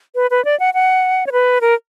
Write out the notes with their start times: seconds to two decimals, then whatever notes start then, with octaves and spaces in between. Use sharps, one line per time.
0.15 B4
0.31 B4
0.45 D5
0.60 F#5
0.74 F#5
1.27 C#5
1.32 B4
1.61 A#4